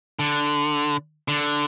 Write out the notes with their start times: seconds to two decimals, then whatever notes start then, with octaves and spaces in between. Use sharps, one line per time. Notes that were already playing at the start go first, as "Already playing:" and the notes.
0.19 D3
1.28 D3